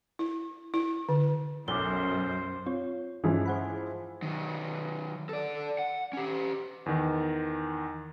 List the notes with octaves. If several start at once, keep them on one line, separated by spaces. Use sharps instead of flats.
E4
E4
D3
B1 F#2 C5 D6 G7
C4 F4 C#5
G2 E3 F3 G#3 C#4
C5 F#5 B5
D#3 F#3
A4 D5
F#5
C#4 G4
E2 D#3